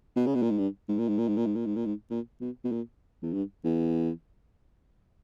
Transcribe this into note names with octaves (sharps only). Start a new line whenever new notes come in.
B2
C#3
B2
A#2
G#2
G2
G#2
A#2
G#2
A#2
G#2
A#2
G#2
A#2
G#2
A#2
G#2
A#2
B2
B2
A#2
E2
G2
E2